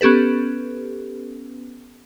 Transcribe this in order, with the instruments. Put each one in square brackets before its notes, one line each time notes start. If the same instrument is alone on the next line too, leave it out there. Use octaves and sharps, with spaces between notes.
[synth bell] B3 C#4 G4 A4 B4